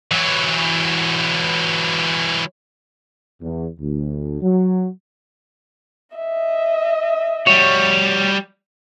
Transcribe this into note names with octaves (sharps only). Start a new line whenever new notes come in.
E3 F#3
E2
D2
F#3
D#5 E5
G3 F#4 C#5